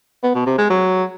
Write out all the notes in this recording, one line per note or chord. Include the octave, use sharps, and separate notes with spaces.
B3
B2
C3
G#3
F#3